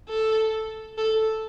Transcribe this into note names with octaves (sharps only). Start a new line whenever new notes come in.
A4
A4